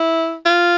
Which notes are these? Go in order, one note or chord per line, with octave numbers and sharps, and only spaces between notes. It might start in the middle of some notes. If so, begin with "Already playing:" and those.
Already playing: E4
F4